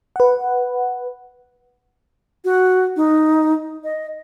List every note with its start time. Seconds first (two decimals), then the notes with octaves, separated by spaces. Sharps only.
0.16 B4 F#5
2.44 F#4
2.96 D#4
3.84 D#5